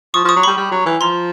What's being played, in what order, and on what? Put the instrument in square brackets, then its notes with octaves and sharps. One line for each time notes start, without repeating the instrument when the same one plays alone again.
[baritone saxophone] F3 [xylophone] C#6 D#6
[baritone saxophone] F3
[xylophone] C#6 D#6
[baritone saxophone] F#3
[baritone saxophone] G3 [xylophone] B5 C#6
[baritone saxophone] G3
F#3
E3
[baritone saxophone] F3 [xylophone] A#5 C6